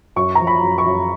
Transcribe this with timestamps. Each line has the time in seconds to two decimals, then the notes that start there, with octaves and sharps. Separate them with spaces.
0.16 F#2 C#6
0.35 F3 A#5
0.47 B5
0.63 F#2
0.78 C#6
0.86 F#2